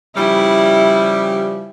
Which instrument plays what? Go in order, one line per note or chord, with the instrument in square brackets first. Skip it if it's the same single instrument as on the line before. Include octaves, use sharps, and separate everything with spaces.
[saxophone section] C#3 F3 G3 [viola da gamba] E4